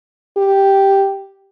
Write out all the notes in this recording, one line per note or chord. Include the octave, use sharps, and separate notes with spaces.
G4